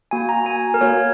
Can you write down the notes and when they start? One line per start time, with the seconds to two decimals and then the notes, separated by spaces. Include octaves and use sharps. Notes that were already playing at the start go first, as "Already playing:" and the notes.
0.11 A#3 F#4 G#5
0.29 A#5
0.46 G#5
0.74 A#4
0.81 A#3 F#4 C#5